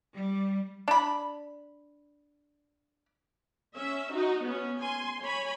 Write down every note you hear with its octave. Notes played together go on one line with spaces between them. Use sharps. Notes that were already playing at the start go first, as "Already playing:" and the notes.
G3
D4 B5
C#4 E5
D#4 F#4
B3 C#4
G#5 C6
C#5 G#5 B5